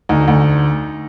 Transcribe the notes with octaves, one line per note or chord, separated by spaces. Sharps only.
D2 D#4
D2